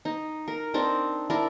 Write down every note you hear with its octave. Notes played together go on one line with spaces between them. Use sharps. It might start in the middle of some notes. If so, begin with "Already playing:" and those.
D#4
A#4
C4 D4 D#4
D4 E4 A#4